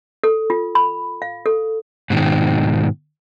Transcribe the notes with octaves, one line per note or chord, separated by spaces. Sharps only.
A4
F4
B5
F5
A4
G#2 B2 D#3